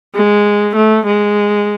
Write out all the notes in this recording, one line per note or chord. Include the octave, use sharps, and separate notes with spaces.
G#3
A3
G#3